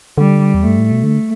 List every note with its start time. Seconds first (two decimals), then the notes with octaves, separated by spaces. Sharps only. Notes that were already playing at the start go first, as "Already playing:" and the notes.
0.18 D3 G3
0.54 E2
0.61 A3
0.67 G2
0.79 A2
0.92 B2
1.04 D3 A3